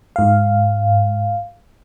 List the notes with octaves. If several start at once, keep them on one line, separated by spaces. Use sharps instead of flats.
G#2 F5